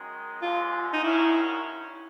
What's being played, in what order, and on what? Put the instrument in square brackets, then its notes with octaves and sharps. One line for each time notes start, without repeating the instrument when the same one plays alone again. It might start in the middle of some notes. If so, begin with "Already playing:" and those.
Already playing: [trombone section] F#2 D#3 G#3
[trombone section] D#2 D3 F3 G#3 [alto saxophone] F4
[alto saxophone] D#4
[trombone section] G2 D#3 F#3 A#3 C#4 [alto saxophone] E4